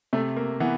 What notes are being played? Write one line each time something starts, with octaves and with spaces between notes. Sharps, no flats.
C3 A3
A#3
E3 B3